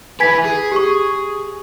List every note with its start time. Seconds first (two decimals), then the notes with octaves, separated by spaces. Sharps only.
0.20 E4 B4 G#5 G#6 B6
0.45 G#4
0.72 G4 C#6